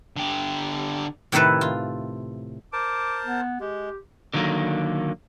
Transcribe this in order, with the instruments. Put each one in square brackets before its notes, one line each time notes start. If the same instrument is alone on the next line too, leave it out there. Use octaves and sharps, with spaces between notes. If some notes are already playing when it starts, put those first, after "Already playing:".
[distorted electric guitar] D3 G4
[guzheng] A2 C3 D#3 E4 A4 B4
F4
[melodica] A#4 C5 A5 [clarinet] D6
[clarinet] B3
[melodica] G#3 [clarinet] G4
[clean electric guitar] D3 D#3 F#3 A#3